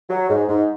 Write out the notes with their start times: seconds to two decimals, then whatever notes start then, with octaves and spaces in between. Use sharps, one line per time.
0.10 F#3
0.29 G#2
0.48 G#2